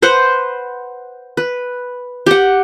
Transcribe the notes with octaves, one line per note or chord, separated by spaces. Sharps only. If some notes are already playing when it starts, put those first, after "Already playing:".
B4 C5 F#5
B4
G4 F#5